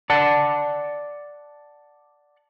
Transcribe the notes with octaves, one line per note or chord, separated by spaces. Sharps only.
D5 F#5 A5